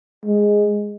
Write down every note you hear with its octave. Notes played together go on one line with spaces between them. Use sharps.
G#3